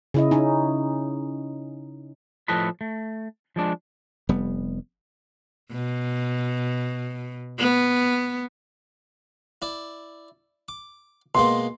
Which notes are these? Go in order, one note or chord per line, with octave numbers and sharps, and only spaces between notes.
C#3 E4 D#5
C#4 D#4
A2 F3 A4 B4 D#5 B5
A3
F3 G#3 D4
F1 G3 B3
B2
B3
E4 D5
D6
B2 G#3 A#3 C6